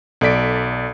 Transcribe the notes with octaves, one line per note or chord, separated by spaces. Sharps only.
B1 A4 D5 B6 D7